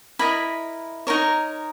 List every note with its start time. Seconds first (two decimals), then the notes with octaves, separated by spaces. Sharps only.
0.19 E4 A#4 D#5 B5
1.07 D#4 A#4 C#5